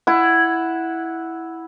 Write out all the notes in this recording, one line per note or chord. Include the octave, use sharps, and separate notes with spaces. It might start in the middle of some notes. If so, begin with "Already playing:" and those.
E4 F#5